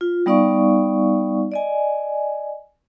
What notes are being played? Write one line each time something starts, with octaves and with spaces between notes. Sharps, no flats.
F4
G3 B3 D#4 D5 F5 C#6
D5 D#5 G#5